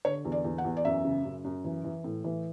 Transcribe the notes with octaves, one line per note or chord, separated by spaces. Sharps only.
D3 C#5
E2
D5
E2
F#5
E2
D5
F#2 E5
C#3
F#2
F#2
E3
E3
A2
E3